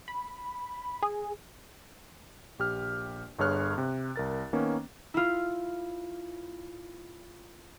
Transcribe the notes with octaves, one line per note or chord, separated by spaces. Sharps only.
B5
G#4
A#1 G4 F6
G1 G2 G#4 C#5 F6 F#6
C3
C2 A#4 A6
D#3 A#3 B3 C#4
E4 F4